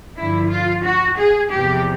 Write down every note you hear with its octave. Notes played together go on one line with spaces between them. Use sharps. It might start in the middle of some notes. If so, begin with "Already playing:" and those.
G2 D3 F3 E4
F4
F#4
G#4
E2 C3 F3 G4